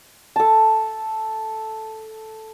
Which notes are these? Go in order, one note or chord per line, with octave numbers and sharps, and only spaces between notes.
A4 A5